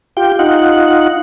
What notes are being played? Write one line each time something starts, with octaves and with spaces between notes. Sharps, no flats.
F4 G4 G5
D#4 F4 F#5